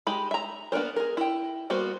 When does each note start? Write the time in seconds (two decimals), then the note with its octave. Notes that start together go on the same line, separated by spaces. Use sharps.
0.07 G#3 D#4 G4 B5
0.31 E5 A#5
0.72 A#3 B3 D4 A#4 C5
0.96 G#4 A#4
1.17 E4 G5
1.70 G3 A#3 B3 F#4 C5